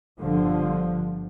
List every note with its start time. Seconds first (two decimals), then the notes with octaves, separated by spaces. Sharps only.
0.21 G1 G2 D3 F3